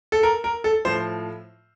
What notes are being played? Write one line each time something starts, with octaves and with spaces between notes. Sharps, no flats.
A4
A#4
A#4
A4
A2 F3 C5